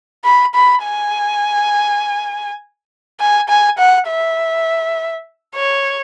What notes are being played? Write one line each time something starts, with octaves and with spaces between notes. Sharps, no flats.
B5
B5
G#5
G#5
G#5
F#5
E5
C#5